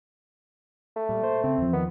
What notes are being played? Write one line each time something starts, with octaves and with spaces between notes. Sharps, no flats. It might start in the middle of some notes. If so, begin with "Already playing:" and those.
A3
A#2 G3
C5
C#3 C4
E2 F3
D#3 B3